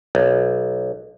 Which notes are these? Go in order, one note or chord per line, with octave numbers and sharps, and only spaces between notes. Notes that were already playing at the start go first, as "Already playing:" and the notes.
B1